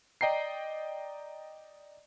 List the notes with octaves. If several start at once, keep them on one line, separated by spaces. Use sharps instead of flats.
D5 D#5 G5 A#5 C7